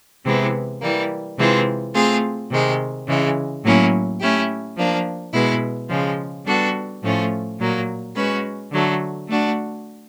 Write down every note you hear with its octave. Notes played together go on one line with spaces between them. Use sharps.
C3 E3 G#3 B3 E4
E3 G3 A#3
C3 E3 G#3 C4 F4
A3 C4 F4 G#4
C3 D#3 G#3
C#3 E3 G#3
A2 F#3 A#3 C#4 E4
A3 C#4 E4 G4
F3 A#3 D4
B2 G#3 B3 E4
C#3 F3 G#3
G3 B3 D4 F#4 A4
A2 F3 A3 C#4 F4
A#2 F#3 A#3
G#3 C#4 F#4 B4
D3 F#3 A3
A3 D4 F#4